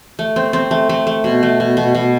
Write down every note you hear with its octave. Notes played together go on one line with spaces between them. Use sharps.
A3
C4
C4
A3
A3
A3
B2
A3
B2
B2
B2